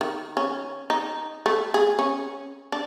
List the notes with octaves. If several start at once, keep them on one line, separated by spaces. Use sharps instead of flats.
D#3
C#4
D#4
A3
G#4
C#4
D4